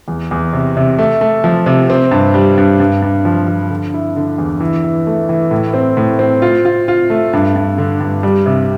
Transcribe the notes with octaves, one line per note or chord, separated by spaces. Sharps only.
E2
E2
C3
C3
A3
A3
F3
C3
C4
G2
G3
G2
G2
G2
F3
F3
D3
E4
D3
E2
E3
E3
A3
E3
A2
C4
A2
C4
F4
F4
F4
A3
G2
G2
D3
G2
G3
C3